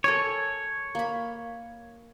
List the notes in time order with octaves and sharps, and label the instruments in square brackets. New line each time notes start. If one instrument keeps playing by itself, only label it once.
[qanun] A4 A#4 G#5 [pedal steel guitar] C#5
[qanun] A#3 B5